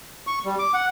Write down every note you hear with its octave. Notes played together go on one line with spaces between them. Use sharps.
C#6
G3
D6
F#5